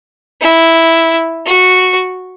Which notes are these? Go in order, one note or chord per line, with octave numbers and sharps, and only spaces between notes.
E4
F#4